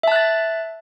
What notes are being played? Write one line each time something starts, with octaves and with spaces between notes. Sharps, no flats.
E5 A5 F#6 A6